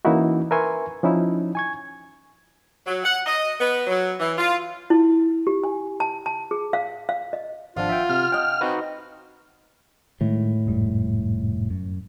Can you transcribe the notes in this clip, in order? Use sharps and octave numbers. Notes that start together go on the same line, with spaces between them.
E3 A#3 C#4 D#4 E4 F#4
A#4 B4 E5 G#5 C6 C#6
F3 C#4 D#4 E4
G#5 C#6 G#6
F#3
F#5
D#5
B3
F#3
E3
F4
E4
G4
G#5
A5
A5
G#4
F5
F5
D#5
G#1 F3 D4 F4 F5 F#5
E5 G5
C3 F6
D#5 G5 A5
C4 D#4 F#4 B4
A2 D#3 G3 G#3
F1 G#2 G3
F#2